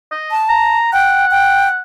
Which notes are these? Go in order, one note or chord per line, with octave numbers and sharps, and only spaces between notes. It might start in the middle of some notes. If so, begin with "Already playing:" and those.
D#5
A5
A#5
F#5 G5
G5